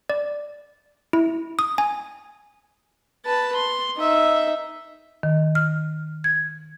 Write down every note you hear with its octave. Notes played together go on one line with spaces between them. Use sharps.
D5
E4
D#6
G#5
B4 A5
C6
D#4 E5
D#3
F6
G#6